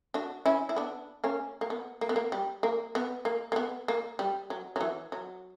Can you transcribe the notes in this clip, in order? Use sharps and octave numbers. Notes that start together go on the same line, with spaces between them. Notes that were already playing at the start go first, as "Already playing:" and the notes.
D4 F#4
C#4 E4
E4
B3 D4
A#3 C#4
A#3
B3
A#3
B3
A#3
G3
A#3
B3
A#3
A#3
B3
A#3
G3
F#3
F#3
E3
F#3